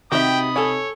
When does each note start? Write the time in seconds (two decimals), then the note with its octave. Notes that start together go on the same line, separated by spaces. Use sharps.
0.12 C3 D#4 F#4 G4 E5 G5 B5 D#6
0.56 A4 C#5 G#5